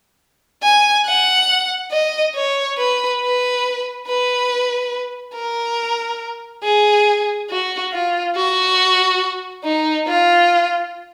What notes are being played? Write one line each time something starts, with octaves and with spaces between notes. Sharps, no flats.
G#5
F#5
D#5
C#5
B4
B4
B4
A#4
G#4
F#4
F4
F#4
D#4
F4